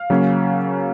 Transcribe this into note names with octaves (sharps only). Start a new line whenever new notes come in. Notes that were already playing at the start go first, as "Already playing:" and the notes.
Already playing: F5
C#3 F#3 A#3 C#4